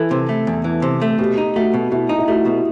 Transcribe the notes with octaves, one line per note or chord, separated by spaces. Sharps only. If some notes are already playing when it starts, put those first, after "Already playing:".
Already playing: E3 A4
C3
A3
E2
E3
C3
A3
A4
B2 G4
D#4
A3 F#4
B2
B2 E4
D#4
E4
A3 F#4
B2